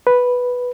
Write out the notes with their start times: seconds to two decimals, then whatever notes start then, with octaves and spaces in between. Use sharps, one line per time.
0.07 B4